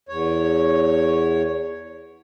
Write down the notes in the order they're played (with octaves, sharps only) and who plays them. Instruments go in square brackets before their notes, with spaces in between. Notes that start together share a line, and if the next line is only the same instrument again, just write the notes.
[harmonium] E2 C#5